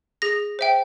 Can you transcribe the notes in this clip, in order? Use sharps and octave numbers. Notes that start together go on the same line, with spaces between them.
G#4 A#6
C5 E5 G5